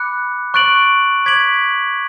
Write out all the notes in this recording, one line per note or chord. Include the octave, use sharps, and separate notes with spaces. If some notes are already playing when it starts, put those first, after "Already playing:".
Already playing: B5 D6 F#6 C#7
C#6 F#6 A6 D7 F#7
D6 G#6 B6 D7 F#7